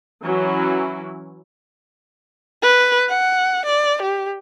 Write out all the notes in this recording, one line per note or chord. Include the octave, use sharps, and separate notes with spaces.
E3 F#3 C#4 E4
B4
F#5
D5
G4